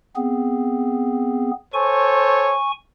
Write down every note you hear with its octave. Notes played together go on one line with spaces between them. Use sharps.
B3 C4 G#4
A4 C5 C#5 G#5 C#6